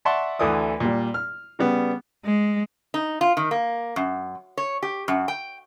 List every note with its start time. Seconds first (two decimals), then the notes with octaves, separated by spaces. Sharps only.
0.05 D5 E5 F#5 A5 C6 C#6
0.39 D2 D3 E3 D5 D#6
0.80 A#2 G3
1.14 F6
1.59 C#3 G3 B3
2.25 G#3
2.94 D#4
3.21 F4
3.37 D#3
3.51 A#3
3.96 F#2
4.57 C#5
4.83 G4
5.08 F#2
5.28 G5